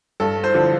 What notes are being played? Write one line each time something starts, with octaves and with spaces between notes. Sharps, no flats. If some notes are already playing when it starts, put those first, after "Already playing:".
G2 A4
C5
D3 F3